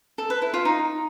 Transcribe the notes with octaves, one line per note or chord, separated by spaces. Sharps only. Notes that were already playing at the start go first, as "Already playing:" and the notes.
A4
B4
E4
F4
D#4